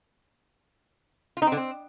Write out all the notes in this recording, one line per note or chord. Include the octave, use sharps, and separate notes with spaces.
F4
D#4
C4
D3
C4